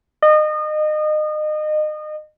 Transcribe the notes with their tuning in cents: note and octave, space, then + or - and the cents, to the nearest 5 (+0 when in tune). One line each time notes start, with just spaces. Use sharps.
D#5 -30